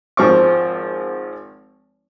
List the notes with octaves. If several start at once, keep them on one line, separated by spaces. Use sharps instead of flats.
G#1 F3 C4 C#6 D6